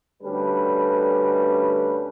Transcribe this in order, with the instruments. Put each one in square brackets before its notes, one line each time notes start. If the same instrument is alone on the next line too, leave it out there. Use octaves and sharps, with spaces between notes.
[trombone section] D2 G3 C#4 A4 B4